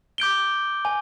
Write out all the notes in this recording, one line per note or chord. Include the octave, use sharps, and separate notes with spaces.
D6 G6 D7 G7
G#5